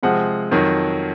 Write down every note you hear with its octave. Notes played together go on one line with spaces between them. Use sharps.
C3 F3 G#3 C4 F#5
F2 D#3 F#3